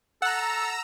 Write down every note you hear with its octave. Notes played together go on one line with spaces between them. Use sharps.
A4 F#5 A#5 E6 F#6